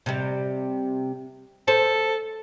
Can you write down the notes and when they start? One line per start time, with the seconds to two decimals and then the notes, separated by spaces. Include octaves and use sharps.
0.06 C3 G3
1.68 A4 C5